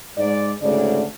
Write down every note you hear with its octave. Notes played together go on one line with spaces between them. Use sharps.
G#2 G#3 D5
D2 G#2 C#3 A3 D4 D5